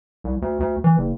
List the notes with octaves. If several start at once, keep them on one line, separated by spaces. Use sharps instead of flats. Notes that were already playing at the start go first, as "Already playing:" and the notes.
C2
D2
D2
E3
F#1